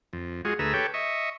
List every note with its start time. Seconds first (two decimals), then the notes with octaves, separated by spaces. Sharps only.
0.13 F2
0.45 G#3 F4 F#4 G#4
0.59 D2 A3 G#4 B4 A#5 E6
0.74 G4 A4 B4 C#5 G5
0.94 D#5 E5 C#6